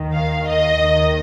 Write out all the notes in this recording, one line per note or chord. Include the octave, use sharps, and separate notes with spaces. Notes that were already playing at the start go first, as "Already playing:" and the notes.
Already playing: D#2 D#3
F5
D#5
D#2 D#3